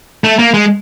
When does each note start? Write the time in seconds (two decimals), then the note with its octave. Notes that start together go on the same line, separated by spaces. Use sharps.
0.24 A3
0.39 A#3
0.54 G#3